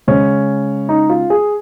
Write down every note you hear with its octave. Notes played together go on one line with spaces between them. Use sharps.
C#3 G#3 C#4
D#4
F4
G#4